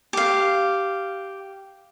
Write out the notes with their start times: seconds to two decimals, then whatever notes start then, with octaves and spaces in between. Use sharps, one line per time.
0.13 G4 F5